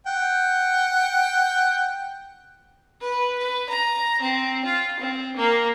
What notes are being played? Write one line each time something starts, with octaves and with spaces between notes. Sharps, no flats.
F#5 G5
B4
B4
A#5
C4
F4
C4
A#3